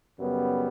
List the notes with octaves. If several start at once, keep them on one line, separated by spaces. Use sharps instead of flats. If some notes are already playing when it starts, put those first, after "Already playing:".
F#2 C#3 G3 B3